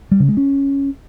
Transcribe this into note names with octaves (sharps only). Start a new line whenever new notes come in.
G3
C#3
G#3
C#4